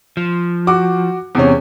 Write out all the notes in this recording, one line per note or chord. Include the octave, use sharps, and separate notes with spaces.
F3
F#4 D6
E2 C3 C#4